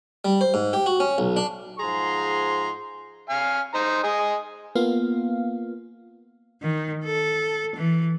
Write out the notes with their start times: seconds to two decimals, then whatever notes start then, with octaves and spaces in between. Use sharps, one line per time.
0.25 G3
0.41 C5
0.54 G#2
0.73 G4
0.86 F#4
1.00 C#4
1.18 B1
1.37 D4
1.79 G#2 F3 G#4 A#5 C6
3.30 F5 G#5 F6
3.74 D#4 C5 A#5
4.03 G#4 D#5
4.75 A#3 B3 F4 F5
6.62 D#3
7.05 A4
7.76 E3